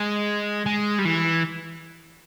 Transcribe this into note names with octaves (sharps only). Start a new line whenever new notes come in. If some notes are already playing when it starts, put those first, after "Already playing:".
Already playing: G#3
G#3
G3
E3